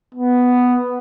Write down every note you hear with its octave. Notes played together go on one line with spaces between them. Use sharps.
B3